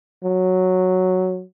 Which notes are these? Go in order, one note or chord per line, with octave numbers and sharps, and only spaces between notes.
F#3